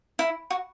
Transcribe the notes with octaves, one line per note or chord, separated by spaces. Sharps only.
E4
F#4